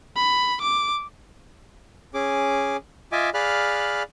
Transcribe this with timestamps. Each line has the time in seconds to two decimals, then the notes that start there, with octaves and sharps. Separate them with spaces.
0.16 B5
0.61 D6
2.14 C#4 G#4 D6
3.12 F4 D#5 E5 G#5 D6
3.34 G#4 D5 F5 B5 F6 F#6